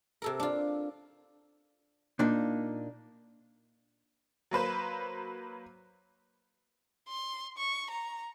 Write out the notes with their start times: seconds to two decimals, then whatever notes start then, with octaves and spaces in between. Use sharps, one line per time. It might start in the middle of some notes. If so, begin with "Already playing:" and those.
0.22 C3 A4 A#4
0.40 D4 F4
2.19 A#2 A#3 D4 D#4
4.51 F#3 A#3 B4 C5
7.08 C6
7.58 C#6
7.90 A#5